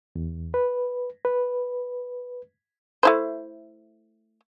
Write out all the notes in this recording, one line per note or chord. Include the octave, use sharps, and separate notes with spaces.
E2
B4
B4
A3 E4 C5